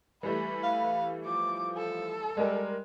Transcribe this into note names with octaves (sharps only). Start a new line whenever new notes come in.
E3 G3 A3 B4
F5
F3 D6
A4
G3 G#3 A#4